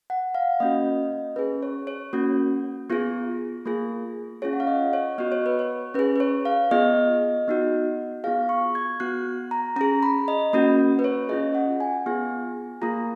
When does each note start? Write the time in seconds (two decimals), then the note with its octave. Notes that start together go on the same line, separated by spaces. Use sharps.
0.10 F#5
0.35 F5
0.60 A#3 C#4 F#4 D#5
1.36 C#4 G#4 B4
1.63 C#5
1.87 C#5
2.13 A#3 C#4 F#4
2.90 B3 F4 G#4
3.65 A#3 F4 G#4
4.42 C#4 F4 G#4 C#5
4.53 F#5
4.60 F5
4.67 D#5
4.93 C#5
5.18 B3 F#4 D#5
5.32 C#5
5.46 B4
5.59 C#5
5.94 C#4 G#4 B4
6.16 B4
6.20 C#5
6.45 F5
6.71 B3 F4 G#4 D#5
7.48 B3 D#4 F#4
8.24 B3 F4 G#4 F5
8.49 C#6
8.75 G#6
9.00 B3 F#4 F#6
9.51 A#5
9.76 C#4 G#4 A#5
10.03 B5
10.28 D#5
10.53 A#3 C#4 F#4
10.99 B4
11.04 C#5
11.29 C#4 F4 G#4 D#5
11.55 F#5
11.80 G#5
12.06 B3 F4 G#4
12.81 A#3 F4 G#4 A#5